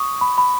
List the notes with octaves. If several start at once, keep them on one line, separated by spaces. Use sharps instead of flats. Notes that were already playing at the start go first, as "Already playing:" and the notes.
Already playing: C#6 D#6
B5
B5